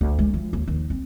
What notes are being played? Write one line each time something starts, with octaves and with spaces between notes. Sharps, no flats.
D2
G#3
F3
D#2
D#2
C4